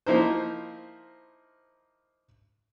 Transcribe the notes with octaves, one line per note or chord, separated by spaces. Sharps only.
F3 A#3 D#4 E4 A#4 C5